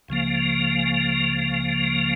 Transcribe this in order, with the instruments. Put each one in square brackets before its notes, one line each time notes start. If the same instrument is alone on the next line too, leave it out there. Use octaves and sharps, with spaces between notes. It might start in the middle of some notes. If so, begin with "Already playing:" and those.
[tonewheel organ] C#2 C#3 F3 A#3